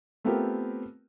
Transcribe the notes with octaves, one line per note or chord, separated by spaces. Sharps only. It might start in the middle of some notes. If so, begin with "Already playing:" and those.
A3 B3 C4 F4 G4 A#4